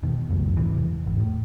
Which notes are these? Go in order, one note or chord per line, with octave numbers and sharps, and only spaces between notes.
E1 B2 D#3
F1 C#2 F#2 A2
G#2 C3 E3
E2
G#1
A2